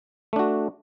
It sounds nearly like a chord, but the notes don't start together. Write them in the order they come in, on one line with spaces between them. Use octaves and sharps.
A3 D4 F#4